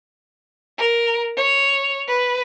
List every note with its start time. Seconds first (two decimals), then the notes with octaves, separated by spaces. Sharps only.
0.78 A#4
1.37 C#5
2.08 B4